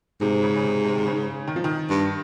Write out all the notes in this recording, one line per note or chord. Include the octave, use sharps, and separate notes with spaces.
G#2 C3
C#3
C#3
C3
C3
D#3
C#3
D#3
F3
D#3
G2